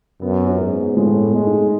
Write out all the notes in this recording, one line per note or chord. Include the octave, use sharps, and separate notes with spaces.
F#2 B3
C#4
G#2
B3
A2 G#3
A3
G#3
D#4